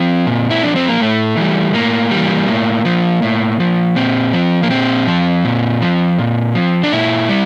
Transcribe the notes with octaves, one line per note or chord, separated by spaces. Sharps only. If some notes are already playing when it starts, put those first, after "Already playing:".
Already playing: F3 C4
A#2
E4
F3 D4
C4
A#3
A2 A3
E3 G3
A2 A#3
E3 G3
A2
F3
A2
F3
A#2 C4
F3
A#3
A#2 C4
F3
A#2
F3
A#2
F3
D4
A#2 E4
G3